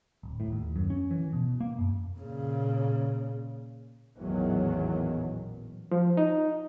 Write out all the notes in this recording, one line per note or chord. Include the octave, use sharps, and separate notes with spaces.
D1
A2
D#2
F#2
C#4
E3
B2
A#3
F#2
A#2 C#3
A1 E2 A#2 D#3 F#3
F3
D#4